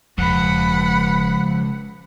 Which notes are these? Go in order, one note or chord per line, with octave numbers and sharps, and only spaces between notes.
E1 C#2 F3 F#5 B5